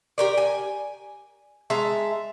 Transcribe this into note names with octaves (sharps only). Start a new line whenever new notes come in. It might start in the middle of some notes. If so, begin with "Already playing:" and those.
G4 A#4 D5
G#5
G#3 E5 A5 A#5